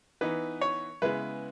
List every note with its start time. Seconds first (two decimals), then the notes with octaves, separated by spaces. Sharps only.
0.21 E3 B3 D#4 B4
0.61 C#5
1.02 C#3 G#3 B3 E4 B4